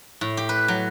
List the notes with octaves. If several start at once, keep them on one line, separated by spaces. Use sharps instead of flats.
A2
G4
B4
F#3